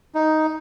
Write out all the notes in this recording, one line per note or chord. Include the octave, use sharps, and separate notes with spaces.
D#4